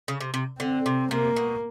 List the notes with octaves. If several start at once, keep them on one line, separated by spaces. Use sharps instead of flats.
C#3
C3
C3
D3 C4
C3
C3 A#3
B2